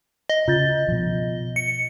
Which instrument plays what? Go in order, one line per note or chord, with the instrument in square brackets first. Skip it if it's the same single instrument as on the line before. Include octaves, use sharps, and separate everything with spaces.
[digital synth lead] D#5
[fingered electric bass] C#3 [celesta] F4 G6 A6
[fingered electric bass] B2 F3
[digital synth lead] C#7